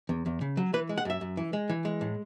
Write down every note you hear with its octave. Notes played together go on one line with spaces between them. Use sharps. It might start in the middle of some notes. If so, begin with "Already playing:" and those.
E2
E2
C#3
F#3
E3 B4
G#3
F#5
F#2 E5
F#2
E3
G#3
E3
G#3
A2